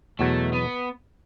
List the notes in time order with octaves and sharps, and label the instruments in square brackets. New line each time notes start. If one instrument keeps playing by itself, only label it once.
[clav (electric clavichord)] E2 B2 F#3 [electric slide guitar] A3
[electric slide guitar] B3